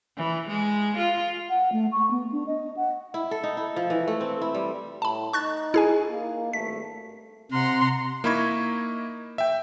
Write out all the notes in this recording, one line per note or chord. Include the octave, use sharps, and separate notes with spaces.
E3
G#3
F4
F#5
A3
C#6
B3
D4
D#5
F#5
E4
A4
D#4
E4
F3
E3
A3
C4
E4
G3
A2 A5 B5
D#4 C#6 F#6 A6
E4 G#4 G#5
A#3
G#1 G2 A3 B6
C3 F#5 A#5 C6
A#3 D#4 E4 B5 C#6 G#6
E5 G5